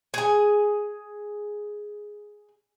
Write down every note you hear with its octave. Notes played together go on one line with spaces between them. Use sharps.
G#4 G#5